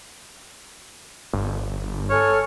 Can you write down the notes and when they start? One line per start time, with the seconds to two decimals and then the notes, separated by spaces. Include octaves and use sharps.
1.33 G1
2.10 A4 C#5 G#5 F6